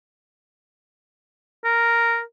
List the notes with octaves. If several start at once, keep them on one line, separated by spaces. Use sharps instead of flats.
A#4